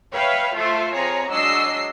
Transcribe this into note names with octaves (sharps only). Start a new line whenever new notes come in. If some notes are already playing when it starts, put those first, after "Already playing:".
B4 C#5 E5 F5 G5
A3 F4 A4 C5 E5
F2 G#4 C#5 A#5
F#3 G#3 D4 D#5 E6 C7